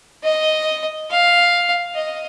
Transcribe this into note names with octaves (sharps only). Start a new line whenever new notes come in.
D#5
F5
D#5